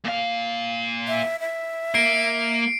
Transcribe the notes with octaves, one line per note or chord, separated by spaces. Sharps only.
A#2 F5
E5
E5
A#3 C7 D7